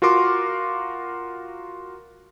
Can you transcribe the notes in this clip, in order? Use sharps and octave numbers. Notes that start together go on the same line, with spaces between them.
F4 F#4 A#4 C6 D6